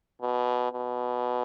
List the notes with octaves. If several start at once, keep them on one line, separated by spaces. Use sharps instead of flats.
B2
B2